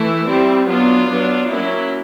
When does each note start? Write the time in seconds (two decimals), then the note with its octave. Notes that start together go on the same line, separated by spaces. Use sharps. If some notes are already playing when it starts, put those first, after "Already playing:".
Already playing: E3 A3 E4
0.26 G3 C4
0.67 F#3 B3 D4 F4
1.08 F#3 B3 D4
1.49 F#3 A#3 C#4 E4